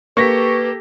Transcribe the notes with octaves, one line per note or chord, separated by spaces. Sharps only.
A#3 G4 A4 B4 C#6 A#6 B6